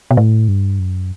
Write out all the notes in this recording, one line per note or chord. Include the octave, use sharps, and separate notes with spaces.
B2
A2
G2
F#2